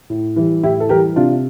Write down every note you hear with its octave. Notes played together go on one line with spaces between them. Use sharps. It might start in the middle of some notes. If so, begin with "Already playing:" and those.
A2
E3 G3
A2 E4 G4
A4
E3 G3 G4 A#4
C3 D4 F4